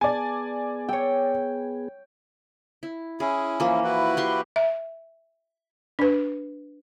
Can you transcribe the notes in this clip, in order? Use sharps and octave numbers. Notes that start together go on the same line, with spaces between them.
B3 G#4 D5 G#5 A5
C#5 G5 E6
E4
C#4 E4 G#4
E3 F3 A#3
E4 F#4 B4
G4 C6 C#6
E5
D4 B4